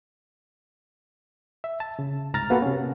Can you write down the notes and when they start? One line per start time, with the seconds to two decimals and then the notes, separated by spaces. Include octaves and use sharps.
1.64 E5
1.80 A5
1.99 C#3
2.33 C2 G#2 A#5 F6 A6
2.50 A#3 B3 F#4 A4 F5 F#5
2.62 C3 C#4